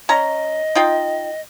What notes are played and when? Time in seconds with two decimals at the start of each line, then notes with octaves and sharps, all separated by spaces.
0.09 C#4 D#5 A#5
0.75 D#4 F4 G5